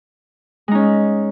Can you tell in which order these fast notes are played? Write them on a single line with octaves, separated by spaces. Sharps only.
G#3 D#4 C#4